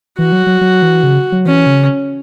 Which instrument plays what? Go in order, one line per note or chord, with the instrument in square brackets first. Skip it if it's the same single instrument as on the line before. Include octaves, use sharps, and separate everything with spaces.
[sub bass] E3 [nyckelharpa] F#4
[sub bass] F#3
F#3
F#3
E3
C#3
F#3
[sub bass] E3 [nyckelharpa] C#4
[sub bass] C#3